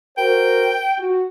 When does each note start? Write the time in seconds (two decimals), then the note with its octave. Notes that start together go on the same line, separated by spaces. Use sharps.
0.18 F#4 A#4 C5 G5
0.98 F#4